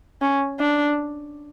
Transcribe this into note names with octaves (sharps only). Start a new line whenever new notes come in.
C#4
D4